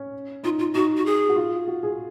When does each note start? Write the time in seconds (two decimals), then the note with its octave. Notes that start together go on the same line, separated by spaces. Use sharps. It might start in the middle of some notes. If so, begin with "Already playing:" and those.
Already playing: C#4
0.44 D#4 F4
0.59 F4
0.75 D#4 F#4
0.97 F#4
1.06 G#4
1.29 F#4
1.36 F4
1.68 F#4
1.83 G#4